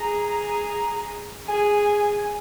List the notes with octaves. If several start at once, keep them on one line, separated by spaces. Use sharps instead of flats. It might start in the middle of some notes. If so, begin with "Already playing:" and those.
Already playing: G#4 A#5
G#4 G#5
G#5